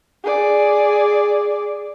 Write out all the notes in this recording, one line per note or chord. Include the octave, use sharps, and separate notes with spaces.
G#4 D5